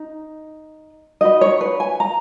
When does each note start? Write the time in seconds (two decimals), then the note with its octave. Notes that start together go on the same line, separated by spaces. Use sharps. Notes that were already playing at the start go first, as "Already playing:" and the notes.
Already playing: D#4
1.21 D#4 F#4 B4 D#5
1.41 C#5
1.61 B4
1.80 G#5
2.00 A#5